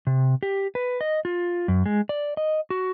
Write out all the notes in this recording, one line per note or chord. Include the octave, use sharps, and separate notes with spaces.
C3
G4
B4
D#5
F4
F#2
G#3
D5
D#5
F#4